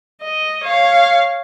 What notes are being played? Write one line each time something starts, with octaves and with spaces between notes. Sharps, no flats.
D#5
C#5 F5